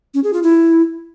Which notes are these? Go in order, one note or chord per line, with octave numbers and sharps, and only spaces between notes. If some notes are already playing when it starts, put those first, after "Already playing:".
C#4
G#4
F4
E4